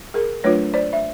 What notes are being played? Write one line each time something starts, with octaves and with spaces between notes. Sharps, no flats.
G#4 A#4
F#3 A3 D4 F4 B4 C#5
C5 D5
E5